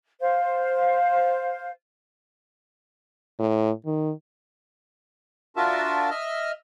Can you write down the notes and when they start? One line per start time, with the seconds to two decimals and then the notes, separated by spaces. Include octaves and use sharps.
0.20 C5 F5
3.39 A2
3.86 D#3
5.57 D4 F4 F#4 A#4 E5 A5
6.10 D#5 E5 F6